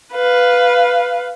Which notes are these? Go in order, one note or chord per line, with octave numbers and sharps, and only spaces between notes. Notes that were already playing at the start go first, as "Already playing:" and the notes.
B4 F5